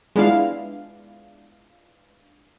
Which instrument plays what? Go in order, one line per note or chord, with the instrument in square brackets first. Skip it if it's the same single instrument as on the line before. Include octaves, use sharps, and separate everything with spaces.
[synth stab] G#3 B3 D4 E4 F4 F5